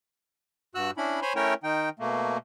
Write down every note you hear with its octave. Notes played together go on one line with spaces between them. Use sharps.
G2 F#4 E6 F#6
C#4 D4 E4 B5
C5 C#5 G#5 B5 C6
A3 C#4 E4 A#4 C#5 G5
D#3 D#4 G5
B2 A3 A#3